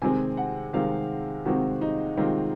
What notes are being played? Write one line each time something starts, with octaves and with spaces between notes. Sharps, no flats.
C3 D#3 G#3 C4 G#5
F#5
C3 D#3 G#3 C4 F5
C3 D#3 G#3 C4 F#4
D#4
C3 D#3 G#3 C4 F4